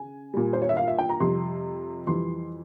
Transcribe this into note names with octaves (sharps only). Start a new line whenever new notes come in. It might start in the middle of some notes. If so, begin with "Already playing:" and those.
Already playing: C#3 G#5
A#2 G3
C5
C#5
E5
F5
E5
G5
A#5
F2 C3 G3 C6
F2 E3 G3 C6